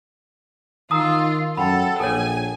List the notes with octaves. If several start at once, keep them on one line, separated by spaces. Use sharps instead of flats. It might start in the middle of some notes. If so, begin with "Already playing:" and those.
D#3 F4 A#5 D#6 E6 C7
F#2 A4 F#5 G5 A5 B5
A#1 A4 A#4 C#5 G#5